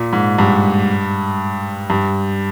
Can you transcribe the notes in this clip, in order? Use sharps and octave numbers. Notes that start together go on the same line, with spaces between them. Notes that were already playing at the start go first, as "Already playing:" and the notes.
Already playing: A#2
G#2
G2
G2